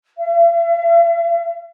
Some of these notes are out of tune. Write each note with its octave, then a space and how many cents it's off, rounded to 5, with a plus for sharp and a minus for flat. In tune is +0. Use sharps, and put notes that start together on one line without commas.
E5 +45